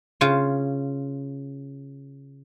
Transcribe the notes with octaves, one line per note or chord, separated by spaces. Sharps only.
C#3 F4